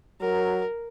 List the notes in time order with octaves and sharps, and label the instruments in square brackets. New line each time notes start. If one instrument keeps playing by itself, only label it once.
[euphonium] F#3 [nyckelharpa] A#4